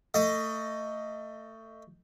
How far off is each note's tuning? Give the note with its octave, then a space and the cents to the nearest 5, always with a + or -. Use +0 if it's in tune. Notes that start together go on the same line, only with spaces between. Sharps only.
A3 +25 D#5 +0